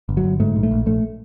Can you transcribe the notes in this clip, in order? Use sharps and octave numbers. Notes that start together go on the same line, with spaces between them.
G1
F#3
G1
G#2 A3
A#1
A3
A#1
A#1 A3